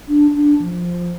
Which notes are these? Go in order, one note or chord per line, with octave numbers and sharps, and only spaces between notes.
D4
D4
F3